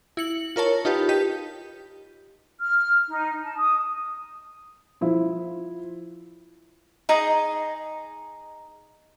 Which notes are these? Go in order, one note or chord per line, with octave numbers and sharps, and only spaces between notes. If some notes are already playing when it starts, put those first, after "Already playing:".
E4 C#7 F#7
F4 A#4 C#5 A5
D#4 F4 G4 B4
G4 D#5 B6
F6
D#4
A5
D#6
F3 E4 F4
D#4 G#4 D#5 A#5